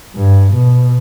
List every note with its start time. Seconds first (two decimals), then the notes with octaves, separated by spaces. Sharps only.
0.16 G2
0.55 B2